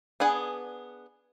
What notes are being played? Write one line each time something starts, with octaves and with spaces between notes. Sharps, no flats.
B3 D4 G#4 F#5 G#5